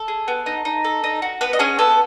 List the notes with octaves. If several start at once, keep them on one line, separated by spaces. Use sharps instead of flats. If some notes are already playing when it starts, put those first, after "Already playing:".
Already playing: A4
G#4
B3
D#4
D#4
A4
D#4
F#4
B3 B4
D#5
C#4 G#4 C#5
B3 A4